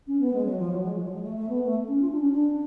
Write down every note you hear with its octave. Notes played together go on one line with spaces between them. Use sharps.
C#4
B3
G#3
F#3
F3
F#3
G#3
F3
F#3
G#3
A3
A3
B3
A3
C#4
F4
D4
C#4
D4